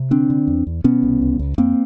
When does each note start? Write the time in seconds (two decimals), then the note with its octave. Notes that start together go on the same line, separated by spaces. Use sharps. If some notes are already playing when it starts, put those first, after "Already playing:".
Already playing: C3
0.10 D3 C4 D4
0.30 D3
0.47 E2
0.67 E2
0.84 B2 B3 C#4
1.03 C2
1.22 C#2
1.39 C#2
1.58 F2 A#3 C4